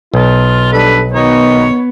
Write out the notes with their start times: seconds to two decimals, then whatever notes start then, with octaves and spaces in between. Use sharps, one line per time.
0.14 B1 F4
0.72 G3 D4 A4 B4
1.13 B2 D#3 B3 D#4 C#5